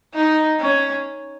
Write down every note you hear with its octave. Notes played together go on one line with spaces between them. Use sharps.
D#4
C#4